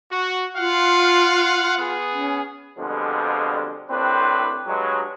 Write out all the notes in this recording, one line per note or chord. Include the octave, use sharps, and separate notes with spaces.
F#4
F4 F5 F#5
B3 G#4
C#4
F2 B2 D3 F3 G3 G#3
C2 A2 C4 D4 B4 C5
G2 F#3 G#3